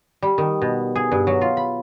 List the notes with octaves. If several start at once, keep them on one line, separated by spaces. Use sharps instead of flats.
G3
D#3
B2
G#4
G2
F#3
F4
B5